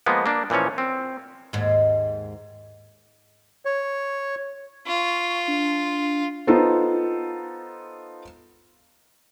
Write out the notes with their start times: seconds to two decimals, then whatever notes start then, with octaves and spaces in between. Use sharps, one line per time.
0.06 F3 G#3 A#3 B3
0.26 A#3 D4
0.50 A#2 E3 F3 C#4 C#5
0.78 C4
1.53 D#2 G#2
3.65 C#5
4.87 F4 C#6
5.48 D4
6.47 B3 D#4 F4 A4 C5